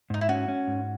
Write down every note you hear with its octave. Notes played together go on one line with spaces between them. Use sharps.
G#2 D#4
E4
C#4 F#4
C#4
G#2